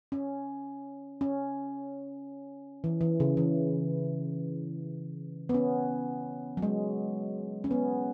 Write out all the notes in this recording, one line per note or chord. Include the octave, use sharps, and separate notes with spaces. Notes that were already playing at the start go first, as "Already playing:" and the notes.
C#4
C#4
E3
E3
C#3
E3
B3
C#4
F#3
G#3
C#4
B3